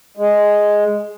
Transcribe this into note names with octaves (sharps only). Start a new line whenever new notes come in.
G#3